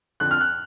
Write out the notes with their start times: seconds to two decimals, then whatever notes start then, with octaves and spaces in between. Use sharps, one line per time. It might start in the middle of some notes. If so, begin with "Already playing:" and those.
0.20 F2 D3 F3 F#6
0.31 F6
0.41 F#6